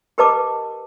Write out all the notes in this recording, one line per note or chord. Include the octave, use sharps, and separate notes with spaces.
G4 A#4 B4 D#5 A5 D6